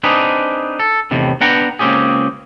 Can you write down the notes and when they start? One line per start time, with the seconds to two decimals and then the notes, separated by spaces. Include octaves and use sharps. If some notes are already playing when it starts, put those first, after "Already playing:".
0.03 C4 D4 D#4 G#4 B4
0.80 A4
1.11 E2 A2 C3 D#3
1.41 B3 D4 B4 F#5 G5 A#5
1.79 C#2 A#3 C4 C#4 G4 G#4